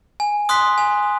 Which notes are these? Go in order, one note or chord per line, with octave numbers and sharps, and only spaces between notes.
G#5
C6 D#6 F#6 B6
G#5